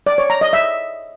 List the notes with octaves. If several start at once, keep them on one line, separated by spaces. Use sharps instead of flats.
D5
C#5
A#5
D#5
E5